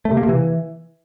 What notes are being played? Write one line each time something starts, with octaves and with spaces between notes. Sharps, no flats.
A3
C3
A#3
C3
E3